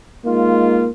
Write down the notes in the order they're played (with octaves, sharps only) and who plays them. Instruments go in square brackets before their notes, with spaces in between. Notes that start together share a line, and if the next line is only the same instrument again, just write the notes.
[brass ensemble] G#3 D#4 F4 [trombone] A#3